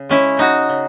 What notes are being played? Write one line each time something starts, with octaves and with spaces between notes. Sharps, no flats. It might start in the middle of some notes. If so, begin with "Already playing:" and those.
Already playing: C#3
G#3 C#4 E4
C#3 D#4 F#4
C#3